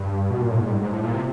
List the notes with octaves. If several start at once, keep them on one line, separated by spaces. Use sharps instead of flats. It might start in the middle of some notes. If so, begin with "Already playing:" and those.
Already playing: G2
B2
A#2
A2
G#2
G2
G#2
A2
A#2
C3